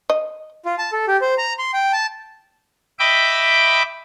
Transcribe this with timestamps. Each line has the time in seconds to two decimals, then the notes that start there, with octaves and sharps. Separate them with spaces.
0.10 D#5
0.65 F4
0.78 A5
0.92 A4
1.08 G4
1.21 C5
1.38 A#5
1.59 C6
1.73 G5
1.93 A5
2.99 D#5 E5 G5 B5 D6